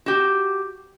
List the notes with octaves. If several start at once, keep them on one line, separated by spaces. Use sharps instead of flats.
F#4 G4